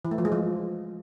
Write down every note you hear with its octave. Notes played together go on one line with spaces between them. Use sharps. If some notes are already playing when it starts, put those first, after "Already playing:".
E3
A3
F3
G#3
F3